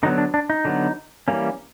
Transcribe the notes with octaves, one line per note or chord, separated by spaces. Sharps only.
D3 F#3 B3 D#4
D4
D4
D#4
D3 F#3 B3
E3 G3 A#3 C#4